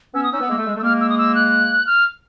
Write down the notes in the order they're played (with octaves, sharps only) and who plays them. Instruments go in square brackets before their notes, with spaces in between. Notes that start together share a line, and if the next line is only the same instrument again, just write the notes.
[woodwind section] B3 C#4 [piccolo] E6
[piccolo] D#6
[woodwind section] C#4 D#4 [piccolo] E6
[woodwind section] B3
G#3 A#3
A3
G#3
A3
[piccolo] E6
[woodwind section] G#3 A#3 [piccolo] F6
[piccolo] E6
D#6
E6
F#6
F6